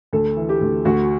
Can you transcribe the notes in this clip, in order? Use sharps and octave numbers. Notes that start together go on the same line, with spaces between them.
D2 A4
E3
G4
D2
D2 F#4